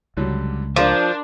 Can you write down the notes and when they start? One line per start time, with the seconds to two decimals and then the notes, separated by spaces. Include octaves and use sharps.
0.17 C#2 D3 F#3 G3
0.76 F3 D4 A#4 C6 D6